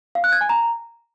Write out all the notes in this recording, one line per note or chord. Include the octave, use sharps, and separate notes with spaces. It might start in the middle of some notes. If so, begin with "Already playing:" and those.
F5
F#6
G#6
G#5
A#5